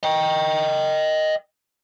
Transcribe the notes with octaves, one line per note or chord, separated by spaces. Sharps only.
D#5 G5